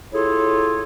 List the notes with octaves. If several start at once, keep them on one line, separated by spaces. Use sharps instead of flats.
E4 F4 G#4 A4 C#5